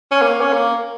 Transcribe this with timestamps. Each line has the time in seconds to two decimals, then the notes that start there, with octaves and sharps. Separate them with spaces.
0.11 C#4
0.22 A#3
0.41 C#4
0.53 A#3